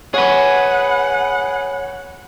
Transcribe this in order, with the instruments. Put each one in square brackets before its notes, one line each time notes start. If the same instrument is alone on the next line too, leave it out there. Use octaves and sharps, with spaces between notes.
[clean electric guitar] G#4 B4 [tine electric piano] C#5 [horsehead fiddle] F#5